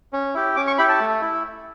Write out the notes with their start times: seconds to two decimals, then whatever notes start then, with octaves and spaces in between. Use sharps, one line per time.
0.13 C#4
0.34 E4 G4
0.56 C#4 D6
0.67 C#6
0.78 E4 G4 B5
0.89 A5
1.00 A3
1.21 E4